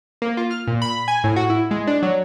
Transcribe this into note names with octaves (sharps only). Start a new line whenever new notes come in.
A#3
F4
F6
A#2
B5
G#5
A2
F#4
E4
G#3
D4
F#3